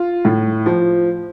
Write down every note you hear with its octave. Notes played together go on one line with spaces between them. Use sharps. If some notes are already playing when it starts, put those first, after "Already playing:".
Already playing: F4
A2
F3